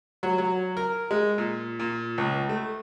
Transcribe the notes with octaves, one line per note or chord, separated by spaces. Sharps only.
F#3
F#3
A#4
G#3
A#2
A#2
C#2
A3